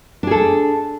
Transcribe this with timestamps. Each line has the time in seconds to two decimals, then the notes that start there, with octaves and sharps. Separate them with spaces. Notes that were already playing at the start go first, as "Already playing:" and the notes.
0.23 D4
0.27 G#4
0.31 A4